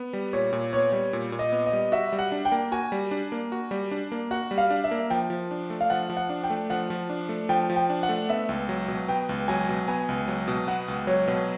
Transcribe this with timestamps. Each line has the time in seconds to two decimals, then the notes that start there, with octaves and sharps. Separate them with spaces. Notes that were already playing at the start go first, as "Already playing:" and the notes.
Already playing: B3
0.13 G3
0.33 A#2 C#5
0.53 A#2
0.73 B3 C#5
0.92 G3
1.13 A#2
1.32 A#2
1.39 D#5
1.52 B3
1.66 D#5
1.73 G3
1.92 F#4 E5
2.12 G3
2.19 F#5
2.32 D4
2.45 G5
2.52 A#3
2.72 F#4 G#5
2.92 G3
3.11 D4
3.32 A#3
3.52 F#4
3.71 G3
3.91 D4
4.12 A#3
4.31 F#4 F#5
4.51 G3
4.58 F5
4.71 D4
4.84 E5
4.91 A#3
5.10 F3 G5
5.30 F3
5.51 D4
5.70 A3
5.81 F5
5.90 F3 F#5
6.10 F3
6.17 F#5
6.30 D4
6.44 G5
6.50 A3
6.70 F3 F#5
6.90 F3
7.10 D4
7.29 A3
7.49 F3 G5
7.70 F3
7.76 G5
7.90 D4
8.03 F#5
8.09 A3
8.29 B3 E5
8.49 C#2
8.69 F#3
8.88 B2
9.08 B3 G5
9.29 C#2
9.48 F#3 G#5
9.69 B2
9.88 B3 G#5
10.09 C#2
10.28 F#3
10.48 B2
10.68 B3 F#5
10.88 C#2
11.07 F#3 C#5
11.27 B2